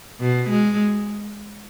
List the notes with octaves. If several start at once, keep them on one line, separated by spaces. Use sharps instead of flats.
B2
G#3